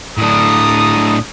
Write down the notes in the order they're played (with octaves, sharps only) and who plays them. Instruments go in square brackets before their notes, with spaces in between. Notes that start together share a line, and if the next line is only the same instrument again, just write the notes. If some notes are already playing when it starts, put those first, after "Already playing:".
[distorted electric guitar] A2 D4 [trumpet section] A4 A#5 D#6